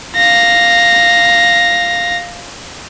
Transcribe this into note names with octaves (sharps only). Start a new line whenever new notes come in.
F5 A#6